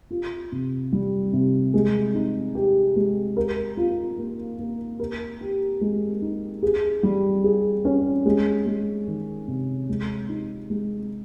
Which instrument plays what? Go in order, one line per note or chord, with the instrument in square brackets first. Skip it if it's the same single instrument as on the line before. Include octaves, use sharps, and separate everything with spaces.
[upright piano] F4
C3
G3
C3
G#3
D#4
G4
G#3
A#4
F4
A#3
A#3
A#4
G4
G#3
D#4
G#4
G3
G#4
C#4
G#3
G#3
D#3
C3
G#3
D#4
G#3